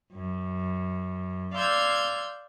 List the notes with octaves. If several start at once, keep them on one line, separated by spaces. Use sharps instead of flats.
F#2
D5 F5 C6 E6 G6 G#6